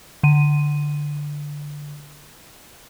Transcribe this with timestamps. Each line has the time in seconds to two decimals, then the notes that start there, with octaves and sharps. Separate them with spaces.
0.23 D3 D#7